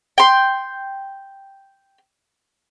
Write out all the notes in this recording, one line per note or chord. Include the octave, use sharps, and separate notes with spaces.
G5 C6